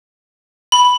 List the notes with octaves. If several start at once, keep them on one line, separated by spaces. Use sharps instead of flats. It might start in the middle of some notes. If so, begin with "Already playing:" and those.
B5